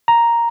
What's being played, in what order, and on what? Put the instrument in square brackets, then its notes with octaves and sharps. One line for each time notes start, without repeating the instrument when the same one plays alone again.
[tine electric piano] A#5